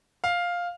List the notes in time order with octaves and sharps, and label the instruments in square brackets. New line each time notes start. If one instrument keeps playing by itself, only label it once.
[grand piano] F5